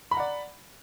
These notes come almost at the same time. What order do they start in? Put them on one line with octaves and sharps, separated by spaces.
B5 A#5 F#5 D5